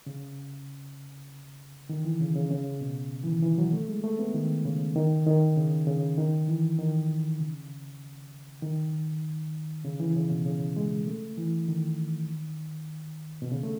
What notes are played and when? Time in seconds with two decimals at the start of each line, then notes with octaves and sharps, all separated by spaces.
0.06 C#3
1.89 D#3
2.05 E3
2.20 C#3
2.36 C#3
2.51 C#3
2.81 B2
3.23 E3
3.28 D#3
3.43 E3
3.58 F#3
3.73 A3
3.89 G#3
4.04 A3
4.19 B3
4.34 D#3
4.65 C#3
4.96 D#3
5.26 D#3
5.57 C#3
5.87 C#3
6.18 D#3
6.48 E3
6.79 D#3
7.40 C#3
8.63 D#3
9.85 C#3
10.00 E3
10.15 C#3
10.31 B2
10.46 C#3
10.77 G#3
11.07 A3
11.38 E3
11.68 D#3
13.42 B2
13.52 C#3
13.63 A3